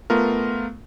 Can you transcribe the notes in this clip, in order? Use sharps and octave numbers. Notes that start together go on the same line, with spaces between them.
A3 B3 F4 A#4